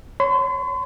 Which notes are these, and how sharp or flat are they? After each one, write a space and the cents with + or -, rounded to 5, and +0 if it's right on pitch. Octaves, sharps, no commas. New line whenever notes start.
C#5 -5 C6 -45